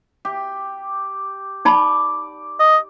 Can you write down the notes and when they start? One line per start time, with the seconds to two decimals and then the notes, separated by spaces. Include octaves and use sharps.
0.25 G4
1.65 D#4 D5 A5 B5
2.60 D#5